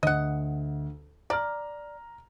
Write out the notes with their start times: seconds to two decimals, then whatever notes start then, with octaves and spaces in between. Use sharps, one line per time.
0.03 D2 D#5 F#5
1.30 D5 A#5 F6